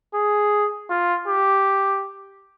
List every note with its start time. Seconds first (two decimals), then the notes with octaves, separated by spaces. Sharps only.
0.14 G#4
0.90 F4
1.28 G4